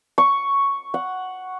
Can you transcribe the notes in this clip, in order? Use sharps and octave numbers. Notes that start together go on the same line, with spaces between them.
C#6
F#5